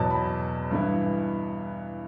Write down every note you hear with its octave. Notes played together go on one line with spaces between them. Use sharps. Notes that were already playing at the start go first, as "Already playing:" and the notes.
Already playing: E2 B2 F#3 A5
B5
G2 E3 B3 E4